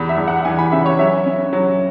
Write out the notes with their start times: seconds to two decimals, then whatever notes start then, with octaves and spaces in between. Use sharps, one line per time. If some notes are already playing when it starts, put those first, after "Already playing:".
Already playing: E2 B5
0.09 E5
0.17 E2
0.28 F#5
0.45 E3 G#5
0.59 B5
0.72 C#3 E5
0.86 C#5
0.99 F#3 E5
1.26 C#4
1.53 F#3